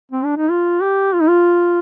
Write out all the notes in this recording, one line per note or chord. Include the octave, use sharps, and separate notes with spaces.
C4
D4
D#4
F4
G4
F4
D#4
F4